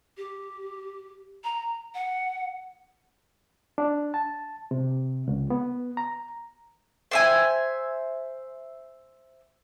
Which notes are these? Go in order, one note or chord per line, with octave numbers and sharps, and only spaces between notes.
G4
A#5
F#5
D4
A5
C3
C#2
B3
A#5
C5 E5 G#5